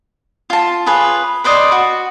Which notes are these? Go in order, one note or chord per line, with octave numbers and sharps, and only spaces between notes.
F4 A5
F4 G#4 B4 C#5
B4 C5 D5 D#5
F#4